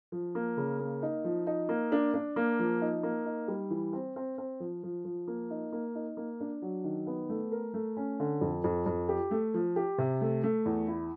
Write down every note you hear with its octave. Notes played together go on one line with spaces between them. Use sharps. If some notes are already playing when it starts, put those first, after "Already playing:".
F3
A#3
C#3
A#3
D#4
F3
D#4
A#3
D4
D4
A#3
F3
D#4
A#3
D#4
G3
E3
C4
C4
C4
F3
F3
F3
A#3
D#4
A#3
D#4
A#3
D4
F#3
D#3
B3
A3
A#4
A3
C#4
D3
F2
F2
F2
G4
A3
F3
G4
C3
A3
A3
E2
E4